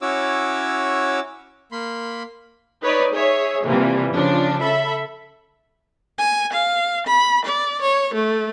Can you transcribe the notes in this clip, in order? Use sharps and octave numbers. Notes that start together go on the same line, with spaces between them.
C#4 E4 F#4 C#5 D6 E6
A#3 B5 C6
D#4 B4 C#5 D5
G#4 C#5 E5
C3 E3 F3 G3 A#3
C#3 F3 D4
A4 E5 B5
G#5
F5
B5
D5
C#5
A3